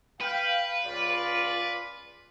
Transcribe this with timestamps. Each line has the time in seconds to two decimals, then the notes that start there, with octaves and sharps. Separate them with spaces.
0.21 B4 F5 G5
0.85 C#2 F4 D5